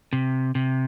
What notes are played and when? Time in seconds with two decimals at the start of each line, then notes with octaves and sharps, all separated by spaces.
0.13 C3
0.55 C3